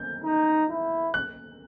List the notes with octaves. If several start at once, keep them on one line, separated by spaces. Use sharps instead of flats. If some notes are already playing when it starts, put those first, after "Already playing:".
Already playing: G6
D#4
E4
F#6